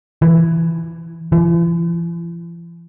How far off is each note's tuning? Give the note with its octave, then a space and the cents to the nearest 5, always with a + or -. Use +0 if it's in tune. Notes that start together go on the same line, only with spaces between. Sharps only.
E3 +10
E3 +45